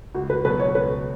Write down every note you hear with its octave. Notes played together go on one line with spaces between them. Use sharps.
C#2 F#4
B4
B2 F#3 B3 B4
C#5
C#2 B4